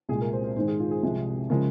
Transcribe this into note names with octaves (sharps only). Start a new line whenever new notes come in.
C2 A#2 G#3 G#4
A#4
C5
C5
G#2 D#3 G#3 C5
G#4
F4
G#4
C2 C3 F3 G#3
C#3 F3 G#3 A#4